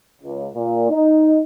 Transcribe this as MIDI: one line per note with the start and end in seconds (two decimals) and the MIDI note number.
0.22 0.47 37
0.53 0.88 46
0.90 1.39 63